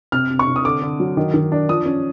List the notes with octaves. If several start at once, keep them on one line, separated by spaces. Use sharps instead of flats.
C3 F6
C3
C#6
C3
D#6
D3 D6
D3
F#3
D#3
D#3
D4
F3 D#6
C#4